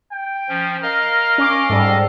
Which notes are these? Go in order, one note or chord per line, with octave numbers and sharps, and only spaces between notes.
G5
F3 C#4
A#4 D#5 F5 F6
C#4 D6
G#2 G3 A4